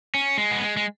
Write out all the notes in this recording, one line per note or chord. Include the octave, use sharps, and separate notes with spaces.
C#4
G#3
B3
G#3
G#3